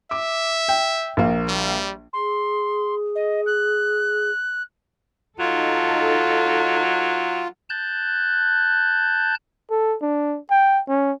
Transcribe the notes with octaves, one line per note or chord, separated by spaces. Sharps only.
E5 D6
G5
A#1 A#3
G3
G#4 C6
D#5
F#6
F#3 D#4 F4 A4
A5 F#6 G6
A4
D4
G5
C#4